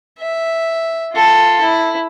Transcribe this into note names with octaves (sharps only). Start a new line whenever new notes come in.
E5
F4 A4
E4